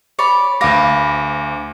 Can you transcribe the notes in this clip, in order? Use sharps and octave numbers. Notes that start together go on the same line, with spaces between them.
C#5 D5 B5
D2 B4 F5 D6 A#6